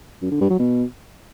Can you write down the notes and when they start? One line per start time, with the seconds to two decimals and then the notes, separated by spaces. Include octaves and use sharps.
0.22 F#2
0.32 D3
0.41 G2
0.50 F#3
0.59 B2